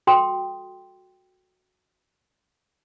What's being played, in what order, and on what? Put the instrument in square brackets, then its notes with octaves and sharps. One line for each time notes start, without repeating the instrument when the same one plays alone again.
[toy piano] F#4 A4 G5 C6 D#6